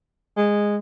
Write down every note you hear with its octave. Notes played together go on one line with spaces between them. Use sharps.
G#3